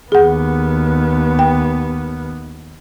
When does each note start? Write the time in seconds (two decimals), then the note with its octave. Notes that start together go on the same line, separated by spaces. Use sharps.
0.12 D#2 B3 G#4 F#5
1.39 G5